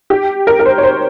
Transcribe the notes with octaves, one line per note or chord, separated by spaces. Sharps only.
G4
A#4
A#4
C5
C#5
C5